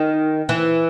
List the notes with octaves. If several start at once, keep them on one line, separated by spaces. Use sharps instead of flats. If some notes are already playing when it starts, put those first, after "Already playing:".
Already playing: D#3
E3